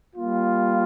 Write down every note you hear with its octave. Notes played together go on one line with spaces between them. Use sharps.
G3 A#3 F4